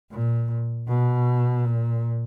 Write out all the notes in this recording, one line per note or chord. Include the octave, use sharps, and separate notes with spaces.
A#2
B2
A#2